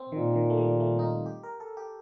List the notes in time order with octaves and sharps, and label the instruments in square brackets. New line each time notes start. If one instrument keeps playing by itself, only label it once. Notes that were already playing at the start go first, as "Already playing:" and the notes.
Already playing: [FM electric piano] C4
[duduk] A#2 [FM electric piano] D#3
[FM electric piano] D#3
A3
G3
A3
D#4
F4
G4
A#4
A4
G4